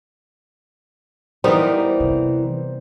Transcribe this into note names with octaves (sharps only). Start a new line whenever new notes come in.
E3 G3 B3 D#4 A#4 C5
C3